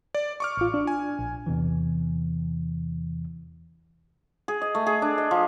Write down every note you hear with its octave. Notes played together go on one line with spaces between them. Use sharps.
D5
C#6 D6 F6
A1 F4
D4
G#5
A#1
E2 C3 E3
G#4
D#5
A3
G#4
D4
D#5
F3